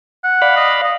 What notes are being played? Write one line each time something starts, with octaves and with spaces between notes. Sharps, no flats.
F#5
D5 F5 B5
D#5
D#5